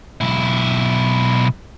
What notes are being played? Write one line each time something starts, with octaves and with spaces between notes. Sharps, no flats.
B1 E4